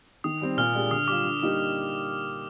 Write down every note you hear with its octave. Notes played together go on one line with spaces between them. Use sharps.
D#3 D#6
G3 C4
A#2 F6
G#3 D4 G4
D3 D#6
G3 D4 F4 D6
D3
G3 A#3 D#4 G4